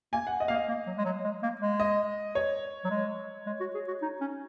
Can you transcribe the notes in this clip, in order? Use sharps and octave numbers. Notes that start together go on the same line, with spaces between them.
A#3 G#5
F#5
D#5
A#3 F5
D#5
A#3
F#3
G#3
F#3
G#3
A#3
G#3
D#5
C#5
F#3
G#3
G#3
F#4
G#4
F#4
D#4
C#4